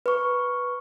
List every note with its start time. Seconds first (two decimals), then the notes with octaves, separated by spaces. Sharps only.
0.06 B4 C#6